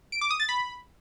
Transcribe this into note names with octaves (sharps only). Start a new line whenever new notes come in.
D7
D6
D#6
A6
B5